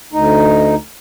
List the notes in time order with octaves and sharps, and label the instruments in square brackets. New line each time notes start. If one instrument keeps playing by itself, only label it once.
[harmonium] D2 D#4